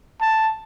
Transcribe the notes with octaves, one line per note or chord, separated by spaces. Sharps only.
A5